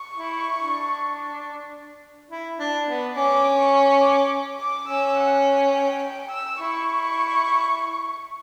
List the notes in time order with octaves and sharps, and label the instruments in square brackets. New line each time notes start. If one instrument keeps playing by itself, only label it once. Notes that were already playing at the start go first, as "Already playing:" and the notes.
Already playing: [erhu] C#6
[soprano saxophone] E4
D4
E4
D4
B3
[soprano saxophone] C#4 [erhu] D6
[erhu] C#6
D6
D6
[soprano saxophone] C#4 [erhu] E6
[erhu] F#5
G5
G5
G5
E6
[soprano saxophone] E4 [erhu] C#6